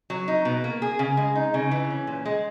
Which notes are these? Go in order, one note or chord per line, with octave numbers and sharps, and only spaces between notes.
F#3
D#4
B2
A#3
G#4
C#3
G#3
D#4
C#3
E3
C#4
A#2
G#3